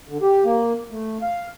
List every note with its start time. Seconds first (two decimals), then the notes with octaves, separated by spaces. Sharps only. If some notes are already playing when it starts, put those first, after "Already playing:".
0.09 D3
0.22 G4
0.44 A#3
0.91 A3
1.22 F5